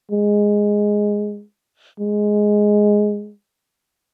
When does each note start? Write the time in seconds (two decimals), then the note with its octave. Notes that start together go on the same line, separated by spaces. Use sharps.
0.11 G#3
2.00 G#3